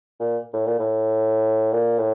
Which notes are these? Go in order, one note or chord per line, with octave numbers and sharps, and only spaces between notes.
A#2
A2
A#2
A2
A#2
A2